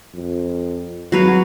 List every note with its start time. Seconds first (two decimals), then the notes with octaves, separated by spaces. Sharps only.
0.15 F2
1.12 G#1 F#3 F#4 B4 F5